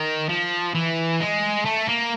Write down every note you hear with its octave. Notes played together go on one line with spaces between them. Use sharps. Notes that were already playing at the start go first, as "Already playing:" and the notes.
Already playing: D#3
F3
E3
G#3
A3
A#3